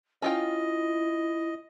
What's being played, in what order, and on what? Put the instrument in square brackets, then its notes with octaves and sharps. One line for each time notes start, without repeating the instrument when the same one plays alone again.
[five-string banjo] C#4 F4 G5 [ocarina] E4 [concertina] D#5